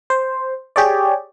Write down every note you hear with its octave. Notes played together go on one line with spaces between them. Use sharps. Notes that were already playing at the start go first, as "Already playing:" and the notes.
C5
G4 G#4 C#5 D5